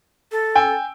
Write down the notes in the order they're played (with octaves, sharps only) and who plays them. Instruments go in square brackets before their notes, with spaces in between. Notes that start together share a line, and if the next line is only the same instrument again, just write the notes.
[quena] A4
[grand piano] G5 G#5 E6